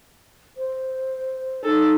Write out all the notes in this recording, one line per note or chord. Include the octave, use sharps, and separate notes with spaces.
C5
D#4 A4